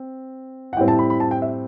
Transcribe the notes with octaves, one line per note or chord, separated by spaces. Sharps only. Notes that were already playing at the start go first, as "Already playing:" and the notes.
Already playing: C4
F#5
A2 G3 C4 G5
A5
B5
B5
A5
G5
E5